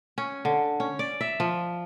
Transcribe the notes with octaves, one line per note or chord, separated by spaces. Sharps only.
C#4
D3
C#4
D5
E5
F3